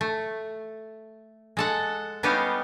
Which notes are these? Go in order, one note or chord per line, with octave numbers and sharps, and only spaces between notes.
A3
G#3 A4 F#5
G3 B3 C#4 D#4 G4 F5